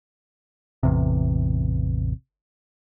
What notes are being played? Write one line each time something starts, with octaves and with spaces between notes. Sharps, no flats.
A1 E2 C3